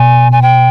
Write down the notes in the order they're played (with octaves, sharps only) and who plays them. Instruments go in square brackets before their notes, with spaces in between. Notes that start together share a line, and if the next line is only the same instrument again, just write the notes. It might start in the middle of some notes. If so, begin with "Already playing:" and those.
Already playing: [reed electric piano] B2 [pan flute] G#5
[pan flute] G#5
G5